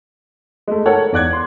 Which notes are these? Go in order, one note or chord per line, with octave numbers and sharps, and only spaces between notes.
G#3 A3
A4 A#4 C#5 F#5
E2 D5 F#6 G#6
C6